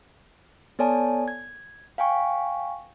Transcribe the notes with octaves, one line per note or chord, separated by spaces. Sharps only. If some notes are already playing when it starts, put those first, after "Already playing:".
B3 A4 C#5 D5 G#5 A5
G#6
F5 G5 G#5 C#6